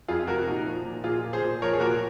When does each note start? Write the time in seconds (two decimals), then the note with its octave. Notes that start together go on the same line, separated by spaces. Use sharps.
0.08 F2 F4 G#4
0.27 C3 F#4 A#4
0.47 A#2 D#4 F#4
0.66 F3
0.85 A#2
1.04 A#2 F4 G#4
1.24 A#2
1.33 G#4 C5
1.42 A#2
1.62 F3 A#4 C#5
1.73 G#4
1.80 A#2 F#4 A#4